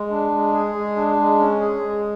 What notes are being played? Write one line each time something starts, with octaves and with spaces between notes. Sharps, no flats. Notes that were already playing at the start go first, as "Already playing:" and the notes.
Already playing: G#3
D4
G#3
G#4
G#3
D4
G#3
C#4
G#4
G#3